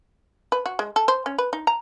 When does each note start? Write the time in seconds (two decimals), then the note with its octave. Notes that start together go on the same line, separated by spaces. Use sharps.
0.52 B4
0.66 F#4
0.79 G#3
0.96 A4
1.08 C5
1.26 C#4
1.38 B4
1.53 D#4
1.67 A#5